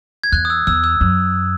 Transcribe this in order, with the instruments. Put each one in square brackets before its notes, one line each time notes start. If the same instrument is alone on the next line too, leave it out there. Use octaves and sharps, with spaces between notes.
[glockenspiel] G#6
[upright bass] E2 [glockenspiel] F#6
[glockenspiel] D#6
E6
[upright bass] E2 [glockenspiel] E6
[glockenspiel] E6
[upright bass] F#2